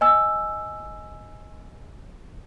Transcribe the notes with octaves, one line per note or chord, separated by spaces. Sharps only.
D#5 G#5 E6